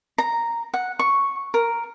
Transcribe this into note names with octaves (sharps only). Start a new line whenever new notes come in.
A#5
F#5
C#6
A#4